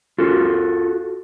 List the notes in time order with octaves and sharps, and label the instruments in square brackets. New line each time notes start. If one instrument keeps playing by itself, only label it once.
[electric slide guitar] F4 F#4 A4